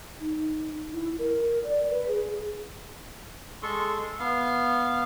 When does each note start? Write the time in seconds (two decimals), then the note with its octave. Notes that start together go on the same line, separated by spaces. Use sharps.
0.20 D#4
0.93 E4
1.19 A#4
1.64 D5
1.90 B4
2.08 G#4
3.63 G#3 A4 C6 C#6
4.19 B3 F5